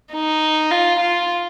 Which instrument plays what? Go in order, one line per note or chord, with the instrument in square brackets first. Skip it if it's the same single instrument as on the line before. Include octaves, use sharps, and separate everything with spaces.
[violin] D#4
F4
F4